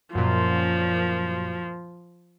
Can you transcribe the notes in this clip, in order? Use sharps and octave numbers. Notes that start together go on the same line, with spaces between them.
F#2 A#2 F3